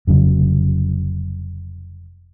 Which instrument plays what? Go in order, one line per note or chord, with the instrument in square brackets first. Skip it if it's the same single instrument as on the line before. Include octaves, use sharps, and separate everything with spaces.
[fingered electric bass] F1 C#3 F#3